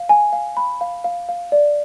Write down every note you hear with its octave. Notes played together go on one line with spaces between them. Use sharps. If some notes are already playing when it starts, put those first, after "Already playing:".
Already playing: F5
G#5
F5
B5
F5
F5
F5
D5